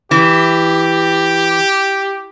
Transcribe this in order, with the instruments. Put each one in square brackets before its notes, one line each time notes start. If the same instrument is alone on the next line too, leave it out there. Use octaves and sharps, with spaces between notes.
[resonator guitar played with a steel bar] E3 [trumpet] G4